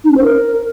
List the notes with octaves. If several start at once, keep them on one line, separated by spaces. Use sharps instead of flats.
D#4
C#4
C5
A#4